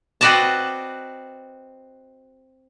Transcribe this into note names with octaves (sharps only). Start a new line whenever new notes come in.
C4 F#4 B4 D5 D#5 A5